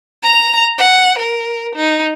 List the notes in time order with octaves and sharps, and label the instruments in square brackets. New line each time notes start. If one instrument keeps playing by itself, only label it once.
[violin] A#5 F7
F#5
A#4
D#4